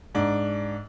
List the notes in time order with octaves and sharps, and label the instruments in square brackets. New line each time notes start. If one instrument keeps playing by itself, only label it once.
[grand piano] G#2 D4